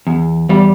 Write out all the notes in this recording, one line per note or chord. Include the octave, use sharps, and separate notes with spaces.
E2
E2 G3